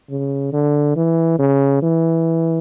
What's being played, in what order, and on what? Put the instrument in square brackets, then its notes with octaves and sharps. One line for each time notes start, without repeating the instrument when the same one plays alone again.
[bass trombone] C#3
D3
E3
C#3
E3